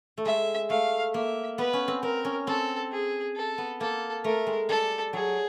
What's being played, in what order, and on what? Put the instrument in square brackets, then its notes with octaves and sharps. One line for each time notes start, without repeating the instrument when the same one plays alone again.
[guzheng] A3
[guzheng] G#3 [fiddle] E5
[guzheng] A3 [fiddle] F5
[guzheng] A#3 [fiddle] E5
[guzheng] B3 [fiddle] B4
[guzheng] C#4
C4
[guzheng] C4 [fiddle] A#4
[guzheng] C#4
[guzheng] C4 [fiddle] A4
[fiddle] G#4
A4
[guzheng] B3
[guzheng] A#3 [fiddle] A4
[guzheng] A3 [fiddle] A#4
[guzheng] G#3
[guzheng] G3 [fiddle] A4
[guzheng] F#3 [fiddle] G#4